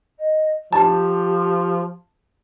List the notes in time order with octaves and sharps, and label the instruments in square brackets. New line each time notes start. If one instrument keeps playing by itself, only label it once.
[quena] D#5
[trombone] F3 [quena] G4 [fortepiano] A5